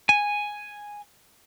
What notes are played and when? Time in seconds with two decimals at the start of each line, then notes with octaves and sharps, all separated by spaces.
0.09 G#5